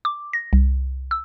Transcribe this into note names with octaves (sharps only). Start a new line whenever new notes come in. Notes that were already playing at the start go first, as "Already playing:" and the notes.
D6
A#6
C2
E6